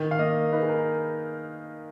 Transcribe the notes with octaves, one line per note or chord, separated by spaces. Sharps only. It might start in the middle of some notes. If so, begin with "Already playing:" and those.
Already playing: D#3
F5
A#3 D#5
D#4 B4
G#4
A#4